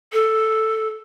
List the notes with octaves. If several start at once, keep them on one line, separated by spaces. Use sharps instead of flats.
A4